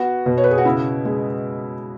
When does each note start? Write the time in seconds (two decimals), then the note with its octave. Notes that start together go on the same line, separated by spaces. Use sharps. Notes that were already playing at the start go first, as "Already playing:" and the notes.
Already playing: B3 F#4
0.26 B2
0.38 C#5
0.44 B4
0.51 G#4
0.58 F#4
0.65 C#3 E4
1.05 G#3